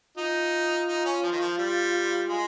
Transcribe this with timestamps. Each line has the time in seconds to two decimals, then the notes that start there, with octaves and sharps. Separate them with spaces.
0.17 D#4 F4
0.88 D#4
1.05 C#4
1.23 F3
1.32 D#3
1.40 F3
1.58 G3
2.28 G#3